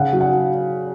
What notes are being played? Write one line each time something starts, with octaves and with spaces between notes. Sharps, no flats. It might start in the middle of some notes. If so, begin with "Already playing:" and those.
Already playing: C#3 F#5
F#3
F#5